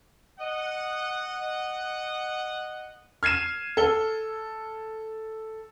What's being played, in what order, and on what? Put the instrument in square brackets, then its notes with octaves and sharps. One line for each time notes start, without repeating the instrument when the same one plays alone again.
[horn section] D#5 F#5
[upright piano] F6 G#6 C7 D#7 E7
A4 G7